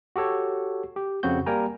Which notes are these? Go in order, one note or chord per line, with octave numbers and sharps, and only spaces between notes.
F#4 G4 A4 C#5
G4
F2 C#3 C4 F#4 G6
G3 A#3 A#4 G5 G#5 A#5